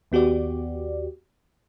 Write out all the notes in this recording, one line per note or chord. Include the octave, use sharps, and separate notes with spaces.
D#2 B3 F#4 G4 D5